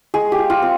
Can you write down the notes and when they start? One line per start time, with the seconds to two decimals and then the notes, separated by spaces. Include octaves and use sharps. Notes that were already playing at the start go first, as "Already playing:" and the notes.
0.14 G#3 G#4
0.32 G4
0.38 F4
0.50 F4
0.62 C4